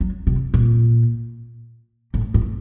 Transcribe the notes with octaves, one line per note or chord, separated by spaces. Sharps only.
F#3
C3
A#2
A2
A2